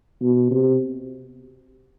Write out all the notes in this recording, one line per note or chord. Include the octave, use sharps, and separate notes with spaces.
B2
C3